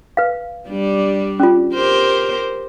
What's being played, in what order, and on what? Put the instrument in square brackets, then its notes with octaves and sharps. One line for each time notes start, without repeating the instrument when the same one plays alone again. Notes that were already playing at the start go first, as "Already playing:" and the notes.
[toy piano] B4 F5
[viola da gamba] G3 D4
[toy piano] C#4 F4
[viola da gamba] G4 A#4 C5